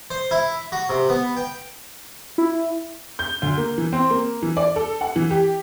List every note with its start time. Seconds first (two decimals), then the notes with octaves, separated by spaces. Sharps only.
0.11 C5
0.31 E4
0.72 F#4
0.89 C3
1.09 B3
1.37 G5
2.38 E4
3.19 G6
3.42 D2
3.57 A#3
3.77 E3
3.93 C4
4.10 A#3
4.42 E3
4.57 D5
4.76 A4
5.01 F#5
5.16 E3
5.31 G4